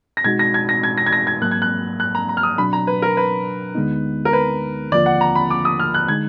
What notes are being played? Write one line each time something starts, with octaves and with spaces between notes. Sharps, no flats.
A#6
B2 G#3 D#4 F#4 G#6
A#6
G#6
A#6
G#6
A#6
G#6
A#6
G#6
G#2 F#3 A#3 F#6
G#6
F#6
F#6
A#5
A#5
F6
D#6
B2 F#3 D4 B5
A#5
B4
A#4
B4
D2 D3 G#3 B3 D#4
A#4
B4
D#2 D3 F3 A#3 F4 D5
F#5
A#5
B5
D6
D#6
F6
F#6
D3 G#3 D#4 G#6